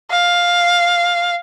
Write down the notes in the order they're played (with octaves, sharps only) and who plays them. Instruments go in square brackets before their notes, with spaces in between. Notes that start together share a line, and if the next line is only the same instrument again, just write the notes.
[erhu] F5